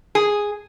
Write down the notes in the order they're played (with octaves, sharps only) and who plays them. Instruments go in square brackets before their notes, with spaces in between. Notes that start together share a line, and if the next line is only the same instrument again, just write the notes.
[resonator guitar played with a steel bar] G#4